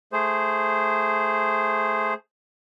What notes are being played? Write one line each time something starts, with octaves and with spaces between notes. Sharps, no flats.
A3 G#4 C5